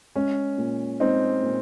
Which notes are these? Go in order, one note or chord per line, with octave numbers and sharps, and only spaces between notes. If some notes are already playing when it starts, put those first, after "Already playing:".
G#3 C#4
A#2
G#3 C4 D#4
A#2